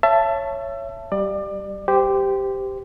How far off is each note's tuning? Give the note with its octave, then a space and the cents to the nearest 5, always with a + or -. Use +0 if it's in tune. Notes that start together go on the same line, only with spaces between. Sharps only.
C#5 +0 E5 +30 A5 +0
G3 -15 D5 +30
G4 +0 C5 -25